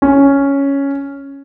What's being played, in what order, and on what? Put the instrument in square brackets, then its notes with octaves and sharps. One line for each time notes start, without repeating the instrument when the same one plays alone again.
[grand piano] C#4